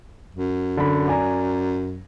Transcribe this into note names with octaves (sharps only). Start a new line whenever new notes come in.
F#2
D3 B5
D5 G#5 A#5